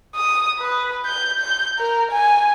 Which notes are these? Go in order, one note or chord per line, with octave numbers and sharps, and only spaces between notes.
D#6
B4
G6
G6
A#4
G#5